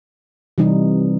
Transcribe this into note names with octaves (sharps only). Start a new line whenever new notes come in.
C3 E3 G3 D#4